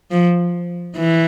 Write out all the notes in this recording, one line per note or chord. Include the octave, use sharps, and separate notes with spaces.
F3
E3